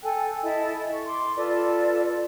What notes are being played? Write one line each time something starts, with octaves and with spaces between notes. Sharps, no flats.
A4 G5 G#5 F#6
E4 A4 D#5
C#6
C6 D6
F4 A4 B4 D5